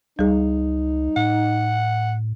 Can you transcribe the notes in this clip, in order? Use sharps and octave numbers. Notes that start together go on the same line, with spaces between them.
C#2 G3 D#4 G#4
A2 F#5